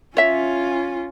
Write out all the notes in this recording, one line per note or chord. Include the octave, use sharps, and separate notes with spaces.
C#4 F4 C#5 E5